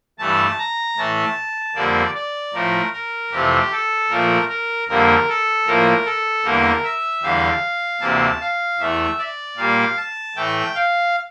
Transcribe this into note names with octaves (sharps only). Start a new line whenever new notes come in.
G2 E3 A3 A5
A#5
A2 E3 A3 A5
F2 D3 G3 A#3 D5
D5
A2 F3 A3 A#4
A#4
F2 C3 E3 A3 G4
A4
A#2 F3 A3 A#4
A#4
F2 D3 G3 A#3 A#4
A4
A2 F3 A#3 A#4
A4
E2 D3 G3 A#3 A#4
E5
E2 D3 G3 F5
D2 C3 E3 A#3 A5
F5
E2 E3 A3 E5
D5
A#2 G3 A#3 F5
A5
A2 E3 A3 G5
F5